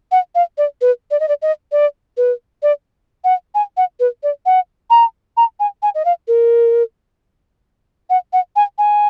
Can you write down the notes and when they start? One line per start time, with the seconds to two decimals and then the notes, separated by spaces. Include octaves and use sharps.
0.12 F#5
0.35 F5
0.58 D5
0.81 B4
1.11 D5
1.20 D#5
1.28 D5
1.42 D#5
1.72 D5
2.17 B4
2.63 D5
3.24 F#5
3.55 G#5
3.77 F#5
4.00 B4
4.23 D5
4.46 F#5
4.90 A#5
5.37 A#5
5.60 G#5
5.83 G#5
5.95 D#5
6.05 F5
6.28 A#4
8.10 F#5
8.33 F#5
8.56 G#5
8.78 G#5